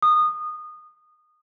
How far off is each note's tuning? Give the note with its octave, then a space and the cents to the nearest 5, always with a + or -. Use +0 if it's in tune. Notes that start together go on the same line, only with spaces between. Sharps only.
D#6 -20